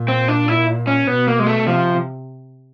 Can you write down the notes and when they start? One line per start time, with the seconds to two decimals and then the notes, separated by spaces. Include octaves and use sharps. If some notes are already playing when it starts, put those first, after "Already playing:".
Already playing: A#2
0.08 C4
0.28 D4
0.48 E4
0.87 C#4
1.07 B2 B3
1.27 A#3
1.39 G#3
1.46 A3
1.67 C3 F3